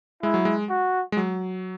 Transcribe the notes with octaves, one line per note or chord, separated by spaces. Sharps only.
G#3 E4
F#3
G#3
F#4
G#3
F#3